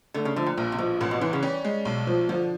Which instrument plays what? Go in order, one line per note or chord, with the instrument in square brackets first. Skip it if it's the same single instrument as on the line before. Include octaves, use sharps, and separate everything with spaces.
[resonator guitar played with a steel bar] D3 [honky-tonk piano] A3
[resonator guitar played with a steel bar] C#3
[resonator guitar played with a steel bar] D3 [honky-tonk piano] F3
[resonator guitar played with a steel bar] A#2
[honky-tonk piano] A#1 [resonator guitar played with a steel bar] A#2
[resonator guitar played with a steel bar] C3
[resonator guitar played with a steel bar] B2 [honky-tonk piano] F3
[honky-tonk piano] A1 [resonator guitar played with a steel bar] A#2
[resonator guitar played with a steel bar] B2
[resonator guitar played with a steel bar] C3 [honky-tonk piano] E3
[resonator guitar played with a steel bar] C#3
[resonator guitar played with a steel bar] G3 [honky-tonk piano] C#4
[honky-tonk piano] G#3
B1
F3
[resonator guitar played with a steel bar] D3 [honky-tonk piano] F3